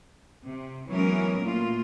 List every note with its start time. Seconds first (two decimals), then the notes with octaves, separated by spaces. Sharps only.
0.45 C3
0.88 E3 F#3 G#3 B3 C#4 A#4
1.42 A#2 A3 A#3 F4